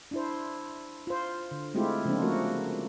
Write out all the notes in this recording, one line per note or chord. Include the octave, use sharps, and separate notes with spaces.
D4 E4 C5
F4 C5
D3
G#3 A3 C4 E4 F4 G4
C#3 F3 G#3 A#3 C4 D4
F3 A3 A#3 F#4 A#4